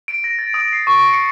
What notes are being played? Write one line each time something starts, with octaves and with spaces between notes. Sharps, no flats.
D7
A#6
A6
D#6
C7
C#6
C#7